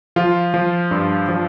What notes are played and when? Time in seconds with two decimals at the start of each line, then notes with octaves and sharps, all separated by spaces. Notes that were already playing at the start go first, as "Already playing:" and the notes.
0.16 F3 F4
0.54 F3
0.91 G2
1.29 F3